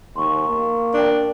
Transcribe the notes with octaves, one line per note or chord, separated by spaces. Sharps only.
D#2 C6 C#6
A#3
D4 A#4 G5